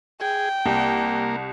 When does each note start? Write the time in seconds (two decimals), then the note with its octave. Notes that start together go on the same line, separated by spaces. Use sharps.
0.21 G#4 G5
0.66 C2 A#3